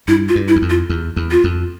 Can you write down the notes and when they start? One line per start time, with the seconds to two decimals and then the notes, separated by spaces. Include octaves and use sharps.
0.08 G2 E4
0.29 F4
0.35 G2
0.48 E4
0.56 E2
0.62 F2
0.70 F4
0.89 E2
1.16 E2
1.31 F4
1.44 F2